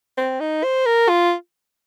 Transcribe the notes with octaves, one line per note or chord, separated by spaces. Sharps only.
C4
D#4
C5
A#4
F4